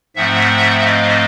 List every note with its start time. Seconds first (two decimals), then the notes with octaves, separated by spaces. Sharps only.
0.16 G#2 F3 A3 C4 E5 F#5
0.80 D#5 F5